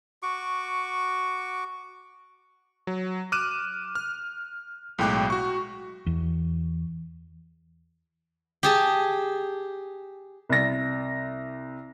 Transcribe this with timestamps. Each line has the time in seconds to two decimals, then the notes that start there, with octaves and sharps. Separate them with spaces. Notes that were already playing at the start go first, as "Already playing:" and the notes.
0.23 F#4 C#6 D6
2.87 F#3
3.32 D6 F6 F#6 D#7 E7
3.95 F6
4.98 B1 A2 G#3 G5 D6 F#6
5.30 F#4 C#6
6.06 E2
8.63 G4 G#4 A5
10.49 C2 A#6